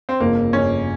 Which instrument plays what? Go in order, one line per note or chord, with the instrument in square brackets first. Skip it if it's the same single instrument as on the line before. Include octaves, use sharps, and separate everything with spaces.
[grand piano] C4
[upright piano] G1 F2 C#3 [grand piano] A#3
[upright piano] G1 F2 C#3 [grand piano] C#4